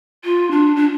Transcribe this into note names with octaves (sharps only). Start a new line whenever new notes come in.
F4
D4
D4